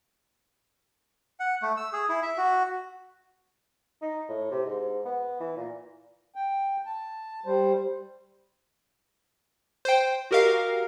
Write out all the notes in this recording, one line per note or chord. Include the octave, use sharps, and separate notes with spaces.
F#5
A3
E6
G#4
E4
E5
F#4
D#4
A2
C3
G#2
B3
E3
A#2
G5
A5
G3 C5
C5 G5
F#4 G4 A#4 D#5 F5